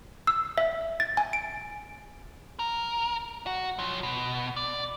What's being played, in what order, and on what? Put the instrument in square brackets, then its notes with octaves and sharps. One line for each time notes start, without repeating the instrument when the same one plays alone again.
[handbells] E6
E5
A6
G#5
D7
[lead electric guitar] A#4
F#4
F3 F#3
B2
D5